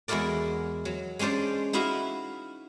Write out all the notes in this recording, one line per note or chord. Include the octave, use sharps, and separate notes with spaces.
E2 G#3 E4 F#4 A#4 D5
F#3
G#3 C#4 D4 C5 D5
D#4 E4 F#4 E5 F5